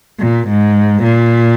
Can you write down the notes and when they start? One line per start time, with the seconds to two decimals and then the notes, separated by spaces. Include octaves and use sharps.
0.19 A#2
0.48 G#2
1.03 A#2